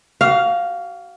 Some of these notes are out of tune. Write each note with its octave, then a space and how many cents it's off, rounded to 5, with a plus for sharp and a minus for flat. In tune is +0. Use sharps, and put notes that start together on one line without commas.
F#4 +35 F5 +0